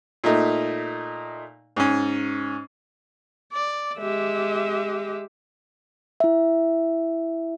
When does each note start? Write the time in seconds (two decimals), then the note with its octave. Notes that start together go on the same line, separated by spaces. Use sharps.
0.24 A#2 A3 D#4
1.76 G#2 C#4
3.53 D5
3.99 G#3 G4 E5
6.20 E4 E5